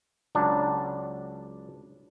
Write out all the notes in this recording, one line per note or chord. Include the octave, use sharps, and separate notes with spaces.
C#2 F#3 D4 A5